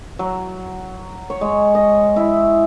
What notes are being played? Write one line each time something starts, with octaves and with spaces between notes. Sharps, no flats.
F#3
C#5
G#3
D#5
E4